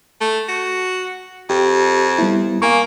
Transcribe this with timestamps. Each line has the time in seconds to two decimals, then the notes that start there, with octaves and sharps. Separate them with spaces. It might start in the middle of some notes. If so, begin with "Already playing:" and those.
0.21 A3
0.48 F#4
1.50 F2 G4
2.19 G3 B3 E4
2.62 A#3 F5 G#5 C#6